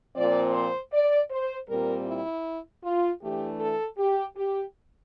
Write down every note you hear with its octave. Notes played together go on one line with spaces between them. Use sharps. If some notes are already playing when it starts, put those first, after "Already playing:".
A#2 F3 C4 D5
C5
D5
C5
A#2 G3 C4 A#4
E4
F4
E3 A3 D4 G4
A4
G4
G4